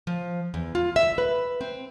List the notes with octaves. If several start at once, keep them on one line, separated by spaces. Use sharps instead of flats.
F3
E2
F4
E5
B4
C4